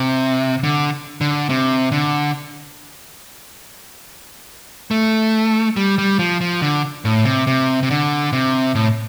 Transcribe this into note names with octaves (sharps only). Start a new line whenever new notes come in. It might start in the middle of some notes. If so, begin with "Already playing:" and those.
Already playing: C3
D3
D3
C3
D3
A3
G3
G3
F3
F3
D3
A2
C3
C3
C3
D3
C3
A2